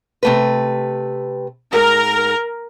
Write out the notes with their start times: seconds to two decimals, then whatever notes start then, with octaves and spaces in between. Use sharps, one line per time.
0.23 C3 A3 B4
1.73 G#2 A#4